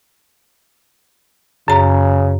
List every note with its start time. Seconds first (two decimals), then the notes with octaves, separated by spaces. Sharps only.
1.68 F#2 C#3 A#5